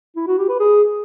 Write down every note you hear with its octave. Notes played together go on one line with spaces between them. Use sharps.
E4
F#4
G4
B4
G#4